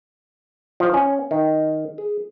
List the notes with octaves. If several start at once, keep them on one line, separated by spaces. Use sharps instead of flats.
F3
C#4
D#3
G#4